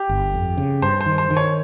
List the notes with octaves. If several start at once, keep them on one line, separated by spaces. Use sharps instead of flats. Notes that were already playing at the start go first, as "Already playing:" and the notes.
Already playing: G4
G1
F2
C#3
G2 C5
C5
D#3
C5
D#3
C#5